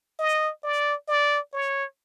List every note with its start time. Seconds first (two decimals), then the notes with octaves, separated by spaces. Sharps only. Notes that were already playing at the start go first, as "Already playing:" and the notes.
0.19 D#5
0.64 D5
1.08 D5
1.53 C#5